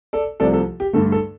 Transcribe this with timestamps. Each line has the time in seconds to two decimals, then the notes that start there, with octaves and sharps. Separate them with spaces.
0.13 A4 D5
0.40 C2 C3 F3 A3 A4 D5
0.54 A4
0.80 G4
0.93 G2 D3 A3 A4
1.12 A4